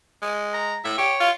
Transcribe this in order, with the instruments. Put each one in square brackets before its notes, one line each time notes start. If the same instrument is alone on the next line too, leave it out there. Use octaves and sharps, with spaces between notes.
[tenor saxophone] G#3
[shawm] A#5
[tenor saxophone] A2 [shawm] E5
[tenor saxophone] G4 [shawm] C#5
[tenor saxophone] F4